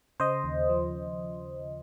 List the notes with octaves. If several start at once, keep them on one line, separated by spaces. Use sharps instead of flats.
C#3 C5 D#5
D#2
F3